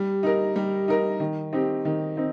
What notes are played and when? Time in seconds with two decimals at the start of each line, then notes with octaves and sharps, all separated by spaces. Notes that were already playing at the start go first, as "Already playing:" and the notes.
Already playing: G3
0.23 D#4 A#4
0.56 G3
0.88 D#4 A#4
1.20 D#3
1.53 C4 D#4 G4
1.85 D#3
2.17 C4 D#4